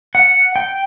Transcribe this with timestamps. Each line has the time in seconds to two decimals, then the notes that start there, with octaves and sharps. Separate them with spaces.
0.15 F#5
0.56 G5